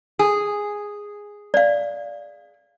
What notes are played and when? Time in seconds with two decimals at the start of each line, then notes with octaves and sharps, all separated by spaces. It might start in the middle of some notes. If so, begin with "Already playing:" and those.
0.19 G#4
1.54 D5 F5